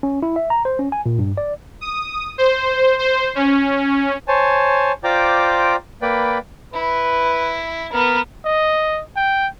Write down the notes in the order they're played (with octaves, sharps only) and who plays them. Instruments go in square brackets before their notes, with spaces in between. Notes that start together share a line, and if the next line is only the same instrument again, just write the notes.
[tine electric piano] C#4
E4
E5
A#5
C5
C#4
G#5
A#2
G2
D5
[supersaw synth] D#6
C5
C5
C#4
[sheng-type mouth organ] C5 C#5 G#5 A5
F4 C5 D5 G5 A#5 D6
A#3 B4 D5 G5 B5
[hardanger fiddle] E4 [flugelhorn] B4
[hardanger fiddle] B3 [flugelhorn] A#4
[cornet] D#5
G5